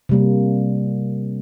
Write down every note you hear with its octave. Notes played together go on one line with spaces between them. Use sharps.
C3 G3 A#3